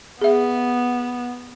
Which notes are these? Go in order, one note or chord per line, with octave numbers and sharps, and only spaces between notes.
B3 G#4 E5